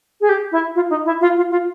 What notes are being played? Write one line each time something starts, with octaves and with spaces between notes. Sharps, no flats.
G#4
G4
E4
F4
D#4
E4
F4
F4
F4